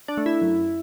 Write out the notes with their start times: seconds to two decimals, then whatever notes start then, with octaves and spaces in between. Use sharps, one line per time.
0.08 D4
0.17 A3
0.26 E4
0.42 F#2